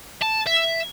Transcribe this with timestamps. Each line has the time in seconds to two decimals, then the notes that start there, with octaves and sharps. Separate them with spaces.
0.22 A5
0.47 E5